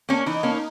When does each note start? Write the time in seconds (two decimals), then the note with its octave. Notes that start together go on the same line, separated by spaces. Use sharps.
0.09 A#3 C#4
0.26 E3 D#4
0.43 A#3 C#4